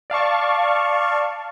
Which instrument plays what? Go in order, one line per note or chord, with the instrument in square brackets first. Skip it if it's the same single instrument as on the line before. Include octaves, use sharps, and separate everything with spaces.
[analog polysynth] D5 F5 A5 C#6